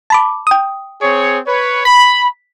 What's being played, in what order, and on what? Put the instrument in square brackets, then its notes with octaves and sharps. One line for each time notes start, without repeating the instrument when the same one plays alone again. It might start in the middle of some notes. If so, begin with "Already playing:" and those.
[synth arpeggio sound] A5 B5 D6
G5 D#6
[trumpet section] C4 G#4 C#5
B4 C#5
[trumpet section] B5 [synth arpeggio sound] B6